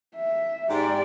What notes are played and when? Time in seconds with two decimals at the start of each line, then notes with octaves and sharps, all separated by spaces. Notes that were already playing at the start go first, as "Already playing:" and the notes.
0.16 E5
0.68 G#2 G4 D5